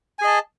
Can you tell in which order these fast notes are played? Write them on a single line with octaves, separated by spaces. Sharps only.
G#5 G#4 D#5 A5